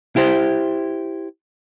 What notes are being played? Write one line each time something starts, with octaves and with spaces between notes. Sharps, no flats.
E4 G4 C5